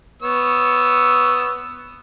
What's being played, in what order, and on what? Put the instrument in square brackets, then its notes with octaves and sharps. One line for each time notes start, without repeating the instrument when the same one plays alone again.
[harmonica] B3 C#5 E6